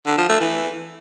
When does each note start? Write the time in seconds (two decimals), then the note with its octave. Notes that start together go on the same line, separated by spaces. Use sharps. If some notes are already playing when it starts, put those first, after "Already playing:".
0.06 D3
0.18 F3
0.29 A3
0.41 E3